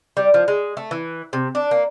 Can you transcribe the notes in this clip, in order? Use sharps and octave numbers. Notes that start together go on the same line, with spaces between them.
G3
F3
G#3
A3
E3
C3
D4
A#3